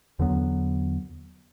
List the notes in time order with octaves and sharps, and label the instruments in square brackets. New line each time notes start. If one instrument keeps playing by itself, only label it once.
[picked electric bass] E2 D3 F#3 B3